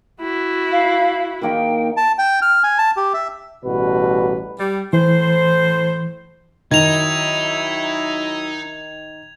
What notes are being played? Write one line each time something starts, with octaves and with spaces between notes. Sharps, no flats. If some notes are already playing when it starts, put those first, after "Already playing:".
E4 F#4
F5
D#3 A#3 D#4 G5
A5
G5
F6
G#5
A5
G4
E5
A1 B2 G3 F#4 B4
G3
A2 E3 C5
D#3 F#3 D#4 E4 G#6 F7